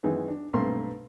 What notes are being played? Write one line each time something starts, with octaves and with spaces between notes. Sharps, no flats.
F#2 D#3 E3 G#3 B3
D4
B1 G2 A3 A#3 C4 C6